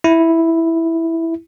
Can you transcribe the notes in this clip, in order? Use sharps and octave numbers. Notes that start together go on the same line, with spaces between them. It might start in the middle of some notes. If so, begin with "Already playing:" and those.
E4